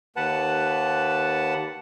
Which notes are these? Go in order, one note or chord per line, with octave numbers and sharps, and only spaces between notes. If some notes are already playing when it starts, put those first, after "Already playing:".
D#2 B4 F#5 A5